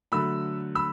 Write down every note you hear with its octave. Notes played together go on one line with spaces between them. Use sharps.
D3 F#3 A3 B5 E6
B5 E6